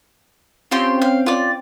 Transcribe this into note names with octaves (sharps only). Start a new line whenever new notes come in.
C4 C#4 F4 G4 G5 C6
F5
F4 D5